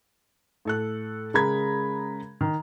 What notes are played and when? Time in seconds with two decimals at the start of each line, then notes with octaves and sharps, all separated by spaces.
0.65 A2 A4 F#6
1.34 C#3 G#3 A#4 A#5 B5 G#6
2.41 D#3